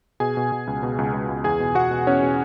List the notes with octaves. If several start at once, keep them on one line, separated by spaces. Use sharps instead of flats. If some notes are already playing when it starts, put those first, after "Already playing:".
B2 G#4 G#5
B2
B2
C#2
B2
C#2
C#2
C#2
E2 G#4 G#5
B2
B2 F#4 F#5
B2
E2 C#4 C#5
B2